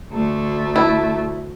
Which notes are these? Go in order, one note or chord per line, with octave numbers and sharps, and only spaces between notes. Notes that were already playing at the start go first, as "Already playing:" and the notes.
D2 A3
E4